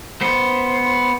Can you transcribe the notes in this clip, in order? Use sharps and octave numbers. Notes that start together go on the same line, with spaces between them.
B3 C5